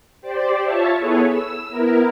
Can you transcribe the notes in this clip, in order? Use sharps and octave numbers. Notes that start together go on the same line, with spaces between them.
G4 C5 D5
F4 C#5 E5 A5
B3 E4 G#4 A4 B4 C#5
E6
B3 E4 A#4